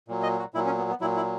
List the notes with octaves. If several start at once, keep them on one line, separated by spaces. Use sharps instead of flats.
A#2 F#3
D#5
F#4
A#2 F#3 E4
C#4
B3
B3
A#2 F#3 E4
E4